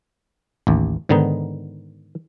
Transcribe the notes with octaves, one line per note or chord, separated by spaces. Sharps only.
A1 D#2
G#2 D3 D#3 B3 D#4